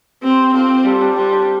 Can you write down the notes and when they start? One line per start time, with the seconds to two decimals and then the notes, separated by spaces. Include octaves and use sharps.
0.23 C4 G4 C5
0.54 C4 F4 A4
0.85 G3 F4 A4
1.01 D4
1.16 G3 C4
1.32 D4